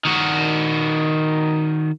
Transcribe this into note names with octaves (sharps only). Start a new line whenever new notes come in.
D#3 F#4